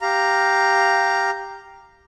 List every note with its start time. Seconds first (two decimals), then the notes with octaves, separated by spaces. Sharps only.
0.01 G4 F5 A#5